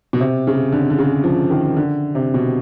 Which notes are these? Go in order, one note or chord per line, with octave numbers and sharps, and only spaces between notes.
B2
C3
C#3
D3
D3
C#3
F3
D#3
D3
C3
B2